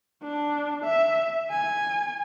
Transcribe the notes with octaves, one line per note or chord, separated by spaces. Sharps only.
D4
E5
G#5